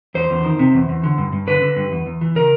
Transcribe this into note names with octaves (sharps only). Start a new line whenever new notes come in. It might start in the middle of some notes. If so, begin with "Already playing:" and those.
E2 C5
E2
D#3
C3
E2
E2
D3
G2
G2
D3 B4
D3
G2
E2
E2
E3
C#3 A#4